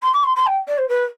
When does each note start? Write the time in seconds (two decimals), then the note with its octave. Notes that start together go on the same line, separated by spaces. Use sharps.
0.02 C6
0.13 D6
0.23 C6
0.35 C6
0.46 G5
0.67 D5
0.78 C5
0.88 B4